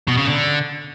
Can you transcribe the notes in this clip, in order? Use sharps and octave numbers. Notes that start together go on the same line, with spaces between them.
B2
C#3
D3